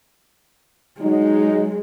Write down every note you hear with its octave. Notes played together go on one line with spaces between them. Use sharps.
F#3 G#3 D#4